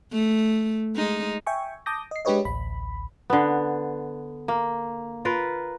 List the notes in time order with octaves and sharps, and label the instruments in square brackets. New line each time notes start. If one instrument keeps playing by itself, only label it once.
[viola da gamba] A3
G#3 D#4
[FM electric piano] E5 G5 G#5 C#6
A5 D6 D#6 G6 A#6
D#5 C7
G#3 D4 G4 B4 C#5 D#5
A1 D2 B5
[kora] D3 B3
A#3
F4 A#4 B4